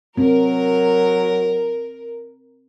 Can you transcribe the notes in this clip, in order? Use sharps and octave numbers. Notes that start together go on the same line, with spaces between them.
F#3 C4 A#4